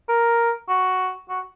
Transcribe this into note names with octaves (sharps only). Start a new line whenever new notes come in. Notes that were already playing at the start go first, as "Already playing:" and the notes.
A#4
F#4
F#4